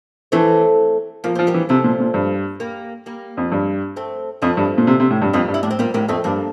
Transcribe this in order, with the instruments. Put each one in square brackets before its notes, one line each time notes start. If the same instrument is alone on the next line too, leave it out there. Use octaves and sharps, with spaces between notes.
[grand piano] E3 [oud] A3 C4
[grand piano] F3 [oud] A#3
[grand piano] F3 [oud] C4
[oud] G3 A#3
[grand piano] E3
[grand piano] C3 [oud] F3 A3
[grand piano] A#2
A#2
G2
[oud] G3 A#3
G3 A#3
[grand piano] F2
G2
[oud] A3 C4
[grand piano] F2 [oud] F3 A3
[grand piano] G2
A#2
C3
C3
A2
G2
[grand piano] F2 [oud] G3 A#3
[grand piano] G2
[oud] E4
[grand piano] A2 [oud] D4
[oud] C4
[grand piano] A#2 [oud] G3 A#3
[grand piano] A2 [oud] G3 A#3
[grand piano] F2 [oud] A3 C4
[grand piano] G2 [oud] A#3 D4